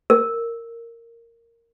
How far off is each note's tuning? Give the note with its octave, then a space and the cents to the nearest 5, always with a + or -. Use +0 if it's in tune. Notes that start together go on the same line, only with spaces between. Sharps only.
A#4 -10